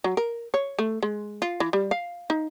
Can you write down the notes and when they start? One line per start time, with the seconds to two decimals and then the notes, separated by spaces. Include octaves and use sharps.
0.04 F#3
0.17 A#4
0.54 C#5
0.79 A3
1.03 G#3
1.42 F4
1.60 E3
1.73 G3
1.91 F5
2.30 D#4